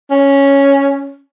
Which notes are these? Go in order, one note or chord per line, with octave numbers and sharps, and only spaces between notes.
C#4